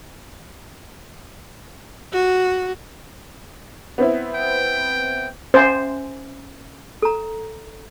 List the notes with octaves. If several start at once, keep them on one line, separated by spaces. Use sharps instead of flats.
F#4
B3 C4 E4
G5
C#4 C5 E5 G#5
A4 A#5